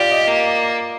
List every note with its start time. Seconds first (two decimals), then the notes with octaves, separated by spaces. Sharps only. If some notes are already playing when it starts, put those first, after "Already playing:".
Already playing: F4 G4 D5
0.11 D#5
0.28 A#3